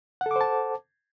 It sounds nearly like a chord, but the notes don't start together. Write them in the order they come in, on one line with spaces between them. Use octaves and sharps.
F#5 A4 D6 C5 A5